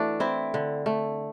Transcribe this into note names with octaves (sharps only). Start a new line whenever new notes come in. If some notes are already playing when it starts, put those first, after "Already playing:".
Already playing: E3 A3 D4 F#4
C4 E4
D3
A3